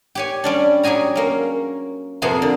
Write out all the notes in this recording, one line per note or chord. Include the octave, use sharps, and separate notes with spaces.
G4 C#5 G#5
G3 C#4 D4
F#3 G4 G#4 G#5 A#5
A#3 C#4
F2 C3 A#3 B3 G#4 C6
D3